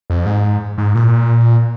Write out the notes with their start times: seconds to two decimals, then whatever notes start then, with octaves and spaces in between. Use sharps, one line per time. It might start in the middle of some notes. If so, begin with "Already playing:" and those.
0.10 F2
0.26 G#2
0.78 G#2
0.95 A#2